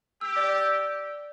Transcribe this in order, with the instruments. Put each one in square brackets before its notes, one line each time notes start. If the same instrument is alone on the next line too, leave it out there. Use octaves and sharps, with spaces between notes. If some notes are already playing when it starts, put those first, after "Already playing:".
[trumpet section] G4 [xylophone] E6
[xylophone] D5
E6